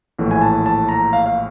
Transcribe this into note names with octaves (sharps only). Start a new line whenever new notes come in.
A#1 A2 E3
G#5
A5
A5
A#5
F5
F5